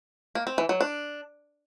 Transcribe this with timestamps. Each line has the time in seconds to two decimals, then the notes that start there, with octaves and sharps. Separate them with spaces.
0.35 A#3
0.47 C4
0.58 E3
0.69 F#3
0.81 D4